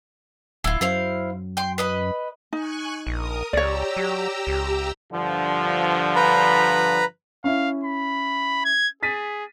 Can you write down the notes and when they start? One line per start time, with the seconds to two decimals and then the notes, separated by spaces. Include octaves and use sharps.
0.64 D1 E4 F4
0.81 F#2 E4 C5 F5
1.57 G5 C6
1.78 B4 D#5 B5
2.53 D#4 G#5 C#6 F#6
3.07 A#1 A#4 D#6
3.53 C#2 G4 C#5 D5 A#5 E6
3.97 F#3
4.47 C#2
5.12 G2 D3 F3
6.16 B4 A#5 B5
7.44 C#4 E4 F5
7.83 B5
8.65 G#6
9.03 G#4 A6 B6 D#7